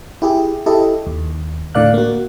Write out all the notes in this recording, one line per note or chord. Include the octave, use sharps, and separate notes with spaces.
E4 G4 G#4
E4 G4 A4 D#5
D#2
A2 D3 D5 F5 F#6
A#3 F#4